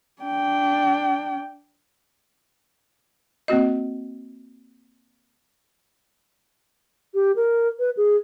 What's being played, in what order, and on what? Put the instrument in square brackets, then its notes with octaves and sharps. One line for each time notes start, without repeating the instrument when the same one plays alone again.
[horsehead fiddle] D4 G5
[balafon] A#3 C4 F#4 D#5
[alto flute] G4
A#4
B4
G#4